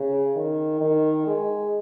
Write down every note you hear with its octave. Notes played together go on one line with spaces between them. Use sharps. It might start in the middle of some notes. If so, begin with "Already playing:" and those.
Already playing: C#3
D#3
D#3
G#3